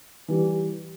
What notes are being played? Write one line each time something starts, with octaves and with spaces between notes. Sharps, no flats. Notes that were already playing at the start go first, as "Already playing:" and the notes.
E3 G3